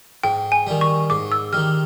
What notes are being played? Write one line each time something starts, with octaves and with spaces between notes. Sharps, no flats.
G#2 G5
G#5
D#3 G3
C#6
G#2 D6
E6
D#3 G3 F6